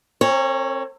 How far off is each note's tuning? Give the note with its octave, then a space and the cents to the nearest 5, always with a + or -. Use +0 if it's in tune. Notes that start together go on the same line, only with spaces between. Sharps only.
C4 +40 A#4 -45 C#5 +0